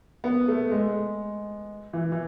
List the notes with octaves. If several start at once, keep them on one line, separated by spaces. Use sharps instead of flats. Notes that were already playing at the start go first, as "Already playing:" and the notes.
B3
A3
G#3
E3
E3